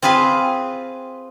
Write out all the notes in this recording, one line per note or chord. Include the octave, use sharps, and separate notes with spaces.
C4 F4 G#4 B4 F5